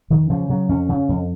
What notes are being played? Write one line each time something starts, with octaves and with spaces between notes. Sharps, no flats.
F2 D#3
C#3 F3
C#3 F#3
F2 C#4
C#3
F2